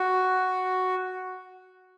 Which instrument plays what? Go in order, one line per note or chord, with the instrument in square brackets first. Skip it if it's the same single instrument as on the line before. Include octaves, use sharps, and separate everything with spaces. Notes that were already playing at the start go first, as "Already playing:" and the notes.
Already playing: [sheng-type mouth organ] F#4